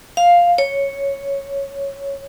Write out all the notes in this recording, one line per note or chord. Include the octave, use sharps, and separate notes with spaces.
F5
C#5